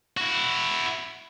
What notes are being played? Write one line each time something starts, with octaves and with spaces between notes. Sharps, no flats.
E4 F#4